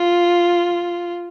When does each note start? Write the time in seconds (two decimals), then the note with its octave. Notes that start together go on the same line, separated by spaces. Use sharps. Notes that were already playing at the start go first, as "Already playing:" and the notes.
Already playing: F4